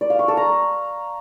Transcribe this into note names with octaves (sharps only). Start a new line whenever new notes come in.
D5
F5
C#6
A4
A#5